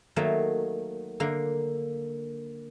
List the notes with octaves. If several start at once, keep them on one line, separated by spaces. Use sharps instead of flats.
D#3 F#3 A3 A#3
D3 A#3